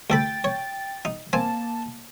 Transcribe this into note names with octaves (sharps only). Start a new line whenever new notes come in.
D2 A4 G5 B5 A6
C#5
D#4
A#3 C4 G#5 A5